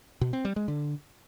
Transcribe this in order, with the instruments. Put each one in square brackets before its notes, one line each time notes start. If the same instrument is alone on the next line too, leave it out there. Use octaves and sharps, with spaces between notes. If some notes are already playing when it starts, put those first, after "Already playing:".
[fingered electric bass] B2
C4
G3
G#3
D3